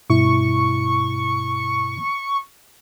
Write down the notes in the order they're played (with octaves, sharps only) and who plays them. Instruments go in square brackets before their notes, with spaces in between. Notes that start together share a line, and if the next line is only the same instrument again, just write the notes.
[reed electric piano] G2 B2 E4 [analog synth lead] C#6